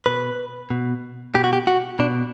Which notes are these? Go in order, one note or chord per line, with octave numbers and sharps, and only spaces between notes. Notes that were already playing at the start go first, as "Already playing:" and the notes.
B2 B4
B2
B2 G4
F#4
G4
F#4
B2 D4